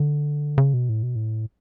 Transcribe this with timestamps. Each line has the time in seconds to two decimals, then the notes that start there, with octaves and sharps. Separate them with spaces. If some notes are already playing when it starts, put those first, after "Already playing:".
Already playing: D3
0.58 C#3
0.74 B2
0.89 A2
1.03 B2
1.16 A2